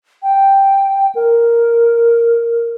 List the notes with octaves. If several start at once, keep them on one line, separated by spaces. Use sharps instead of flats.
G5
A#4